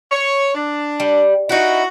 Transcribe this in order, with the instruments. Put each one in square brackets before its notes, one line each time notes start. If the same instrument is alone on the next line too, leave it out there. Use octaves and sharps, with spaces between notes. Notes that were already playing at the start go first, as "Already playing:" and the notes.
[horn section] C#5
D4
[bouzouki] G3
[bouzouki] D#4 E4 [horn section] F#4